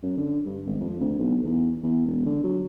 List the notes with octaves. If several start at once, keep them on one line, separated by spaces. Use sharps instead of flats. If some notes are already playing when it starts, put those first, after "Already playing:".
F#2
D3
G2
G#1
F2
D2
B1
E2
E2
E1
D3
F#3